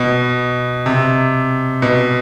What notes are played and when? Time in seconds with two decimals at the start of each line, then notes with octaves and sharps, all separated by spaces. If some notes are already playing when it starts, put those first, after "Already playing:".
Already playing: B2
0.86 C3
1.82 B2